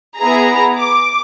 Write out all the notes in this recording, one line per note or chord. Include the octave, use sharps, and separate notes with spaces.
B3 E4 G#4 A#5
D6